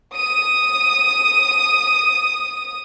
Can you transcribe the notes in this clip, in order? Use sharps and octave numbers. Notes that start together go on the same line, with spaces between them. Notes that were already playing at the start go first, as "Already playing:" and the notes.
D#6 D#7